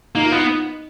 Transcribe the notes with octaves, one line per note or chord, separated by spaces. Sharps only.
A#3 D#4
F4
B3 D#4